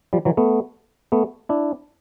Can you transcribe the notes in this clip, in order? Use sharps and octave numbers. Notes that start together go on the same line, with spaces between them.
F3 G3
E3 F#3
A3 B3
A3 B3
D4 E4